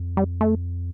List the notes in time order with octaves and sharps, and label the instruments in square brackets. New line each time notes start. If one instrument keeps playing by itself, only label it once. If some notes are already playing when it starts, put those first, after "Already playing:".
Already playing: [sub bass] F2
[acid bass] G3
A3